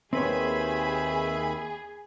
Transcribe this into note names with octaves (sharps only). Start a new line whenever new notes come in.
D#2 D#3 C4 G#4 B4 C#5 E5 B5